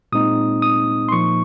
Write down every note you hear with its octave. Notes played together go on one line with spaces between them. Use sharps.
A#2 G#3 C4 D#4 D#6
D#6
C6
A#2 F3 A#3 D#4 C#6